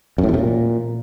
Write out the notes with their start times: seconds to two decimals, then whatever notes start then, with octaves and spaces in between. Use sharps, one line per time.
0.18 F#2
0.23 A2
0.29 E2
0.34 C3
0.39 A#2